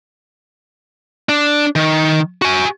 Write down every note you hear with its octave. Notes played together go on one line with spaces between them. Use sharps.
D4
D#3
F#4 G#5